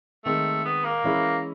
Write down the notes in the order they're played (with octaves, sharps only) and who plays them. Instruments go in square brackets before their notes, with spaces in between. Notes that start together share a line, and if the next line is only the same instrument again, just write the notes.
[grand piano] D#3 G#3 C4 D#4 [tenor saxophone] A3
[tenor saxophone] B3
A#3
[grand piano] E3 G#3 C#4 E4